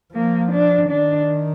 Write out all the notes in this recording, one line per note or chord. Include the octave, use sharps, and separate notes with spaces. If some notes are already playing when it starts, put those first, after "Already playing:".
F3 A#3
D4
D#3 D4